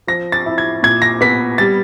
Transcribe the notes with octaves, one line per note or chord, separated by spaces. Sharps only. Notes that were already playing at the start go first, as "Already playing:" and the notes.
F3 A#6
A6
E4
G#6
A#2 G#6
A#6
B3 B6
G3 A6